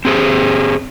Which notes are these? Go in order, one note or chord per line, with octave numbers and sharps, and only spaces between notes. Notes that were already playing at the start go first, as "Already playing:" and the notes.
C4 G4 G#4 C5